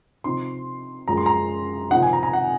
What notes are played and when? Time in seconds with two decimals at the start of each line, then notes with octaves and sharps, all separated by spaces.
0.24 C3 F3 C4 D#4 C6
1.08 F#2 F3 G#3 A#5
1.17 C6
1.26 A#5
1.91 C3 F3 C4 D#4 F#5
2.02 G#5
2.13 A#5
2.23 A#5
2.33 F#5